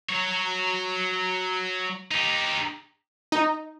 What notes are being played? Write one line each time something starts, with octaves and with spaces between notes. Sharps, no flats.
F#3 C#5
D#4 G4
D#4